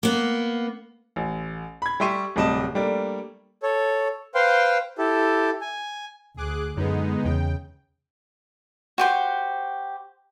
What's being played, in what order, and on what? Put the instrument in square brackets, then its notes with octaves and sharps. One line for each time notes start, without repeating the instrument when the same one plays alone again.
[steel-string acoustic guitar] A#3 B3
[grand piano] A1
B5 G#6
G3 G4 E5 C6 C#6 D#7
D1 C3 G3 D#5 A5 E7
G3 A3 A#3 D4
[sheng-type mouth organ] A4 C#5
B4 C5 F5 G5 C6
E4 G4 A4
G#5
[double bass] D2 [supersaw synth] G#4 D6 F#6
[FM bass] F#2 [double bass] D3 [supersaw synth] G#3 B3 D#4
[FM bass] E2 [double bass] C#3 [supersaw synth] G5
[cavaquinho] F#4 G4 C5